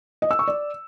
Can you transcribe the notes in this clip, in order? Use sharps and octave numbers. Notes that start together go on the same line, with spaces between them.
D#5
E6
C#6
D5